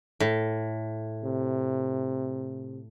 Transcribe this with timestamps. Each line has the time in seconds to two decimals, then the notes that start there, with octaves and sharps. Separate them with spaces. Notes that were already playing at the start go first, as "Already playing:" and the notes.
0.20 A2
1.24 C3